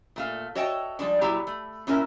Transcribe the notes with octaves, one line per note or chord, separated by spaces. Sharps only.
A#2 A3 F5
F#4 C#5 D#5 E5 G5 A5
F3 G3 G#3 D4
A#2 F#3 E4 G4 A#5
A3
A#2 C#4 E4 A#4 E5